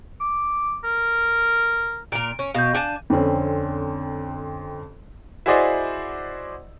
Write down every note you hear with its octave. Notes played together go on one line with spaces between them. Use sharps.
D6
A#4
A#2 A#4 D7
C#4
B2 F5 G6
D4 G#5 A5
F2 D3 C4 C#4
E4 F#4 G#4 C5 D5 D#5